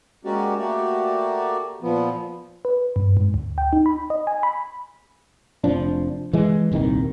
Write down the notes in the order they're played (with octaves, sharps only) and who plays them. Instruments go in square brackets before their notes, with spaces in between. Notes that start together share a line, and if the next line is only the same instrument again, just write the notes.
[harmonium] G#3 A#3 C#4 F#4 G4 D5
A3 A#3 F#4 G4 D5
A#2 F3 B3
[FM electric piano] B4
G2
G#2
D2
G5
D#4
B5
D#5
G#5
B5
[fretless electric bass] F1 F3 D4
E3 G#3
D#1 C2 C3 D#3